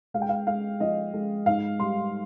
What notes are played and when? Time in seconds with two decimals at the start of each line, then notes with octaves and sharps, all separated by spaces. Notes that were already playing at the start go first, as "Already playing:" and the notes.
0.14 G#3 F5
0.22 G5
0.29 F5
0.47 G#3 F5
0.80 F3 D#5
1.14 G#3
1.46 G#2 F5
1.80 G3 C6